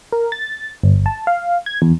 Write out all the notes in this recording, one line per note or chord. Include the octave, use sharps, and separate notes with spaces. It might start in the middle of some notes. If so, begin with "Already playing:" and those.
A#4
A6
G1
A5
F5
G#6
E2